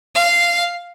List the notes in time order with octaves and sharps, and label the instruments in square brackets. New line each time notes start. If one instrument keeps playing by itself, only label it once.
[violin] F5